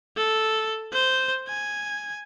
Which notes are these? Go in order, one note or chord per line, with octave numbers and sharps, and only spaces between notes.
A4
C5
G#5